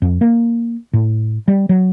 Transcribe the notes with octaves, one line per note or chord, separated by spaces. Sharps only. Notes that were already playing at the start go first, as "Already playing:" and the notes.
F2
A#3
A2
G3
F#3